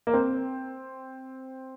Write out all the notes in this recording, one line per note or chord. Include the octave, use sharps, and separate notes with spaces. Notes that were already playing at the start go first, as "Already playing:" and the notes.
A#3
C4